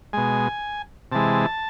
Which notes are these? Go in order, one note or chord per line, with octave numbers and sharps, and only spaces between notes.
B2 G#3 G#5
C3 E3 G#3 A5